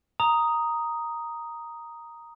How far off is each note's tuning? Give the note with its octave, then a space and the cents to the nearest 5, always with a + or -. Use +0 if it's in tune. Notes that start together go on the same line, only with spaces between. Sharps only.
A#5 +0 D#6 +0